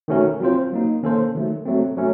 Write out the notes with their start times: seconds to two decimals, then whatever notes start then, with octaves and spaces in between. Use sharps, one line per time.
0.08 D#3 A3 C#4 F#4 A#4
0.40 F#3 C4 F4 C5
0.72 F#3 A#3 D#4
1.03 D#3 A#3 C#4 A4 C5
1.35 D#3 F#3 A3
1.65 F#3 A3 C4
1.97 F#3 A3 C#4